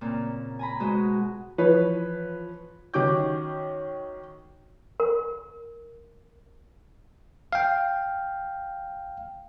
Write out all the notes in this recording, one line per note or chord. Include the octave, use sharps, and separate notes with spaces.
A#2 C#3 A#3 C4
G#5 A#5 B5
B2 G#3 F#4 C5 D#5
E3 F3 B4 C#5
D#3 C#4 F#4 D6 G6
A#4
F5 G5